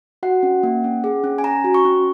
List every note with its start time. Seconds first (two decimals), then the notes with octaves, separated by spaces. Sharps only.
0.23 F#4 F#5
0.43 C#4
0.63 A#3
0.84 C#4
1.04 G#4
1.24 C#4
1.38 G#5
1.44 C#4 A#5
1.64 F#4
1.74 C#6
1.85 C#4